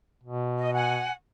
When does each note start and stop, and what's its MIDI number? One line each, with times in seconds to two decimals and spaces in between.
0.23 1.07 47
0.58 0.72 75
0.73 1.12 78
0.73 1.12 80